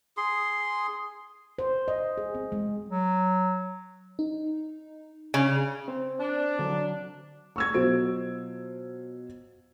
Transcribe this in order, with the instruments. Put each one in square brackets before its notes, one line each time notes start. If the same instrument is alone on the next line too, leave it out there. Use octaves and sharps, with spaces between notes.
[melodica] G#4 C6
[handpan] C5
D#5
G#4
C4
G#3
[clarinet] F#3
[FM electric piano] D#4
[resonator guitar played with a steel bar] C#3 [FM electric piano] G#5
[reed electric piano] C4 C5
[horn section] D4
[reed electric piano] D3 F#3
[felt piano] C#6 E6 G#6
B2 F#3 F4 C5 D7